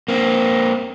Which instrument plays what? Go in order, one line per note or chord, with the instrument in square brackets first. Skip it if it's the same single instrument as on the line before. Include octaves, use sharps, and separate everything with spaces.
[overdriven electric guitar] A#3 C4